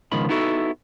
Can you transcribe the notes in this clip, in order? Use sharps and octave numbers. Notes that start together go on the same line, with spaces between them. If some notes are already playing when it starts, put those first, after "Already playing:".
C#2 B2 D#3 F3 B5
B3 D#4 E4 F#4 A4